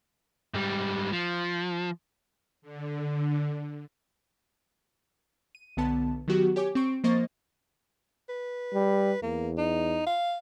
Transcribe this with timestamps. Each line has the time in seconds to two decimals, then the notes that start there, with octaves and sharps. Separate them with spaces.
0.54 G#2 G3
1.13 F3
2.62 D3
5.55 D#7
5.77 B1 D3 B3 A5
6.28 D#3 F#3 B3 F#4 G4
6.56 G4 C#5 G#5 D6
6.75 C4 C#6 D7
7.04 F3 A#3 C5 D#5 C#6 A6
8.29 B4
8.74 G3
9.23 E2 A#3
9.58 D#4
10.07 F5